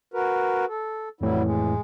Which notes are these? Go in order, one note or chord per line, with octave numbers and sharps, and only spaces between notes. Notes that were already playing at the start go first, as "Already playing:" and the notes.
F#4 A#4 B4
A4
F2 A2 E3 F#3 G3 E4
G#3